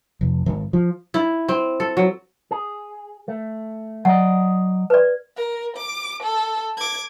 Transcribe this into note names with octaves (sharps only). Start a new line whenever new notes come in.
F1
G#1
F3
E4
C4
A4
F#3
G#4
A3
F#3 D5 D#5 F#5
B4 D5
A#4
D6
A4
D6 G#6